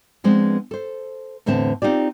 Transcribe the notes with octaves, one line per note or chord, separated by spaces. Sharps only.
F3 G#3 B3 C4 D4
A4 C5
E2 A2 D3 C4 C5 A5
C4 D#4 F4 G4 D5